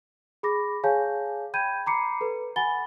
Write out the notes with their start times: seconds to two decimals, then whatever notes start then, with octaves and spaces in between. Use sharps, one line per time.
0.43 G#4 B5 D6 A#6
0.84 G#4 C#5 F5 G#5 A5 G6
1.54 G5 B5 G6 G#6 D#7
1.86 A#5 B5 D6 C7 C#7
2.21 A4 B4
2.56 F#5 G#5 B5 A6 G7